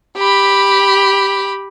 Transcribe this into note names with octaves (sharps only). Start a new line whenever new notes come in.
G4 B5